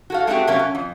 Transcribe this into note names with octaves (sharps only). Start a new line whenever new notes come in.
F#4 A4 F5
G#3 A3 C4 F#4 G4
C3 F#3 A#3 C#4
C#4
F2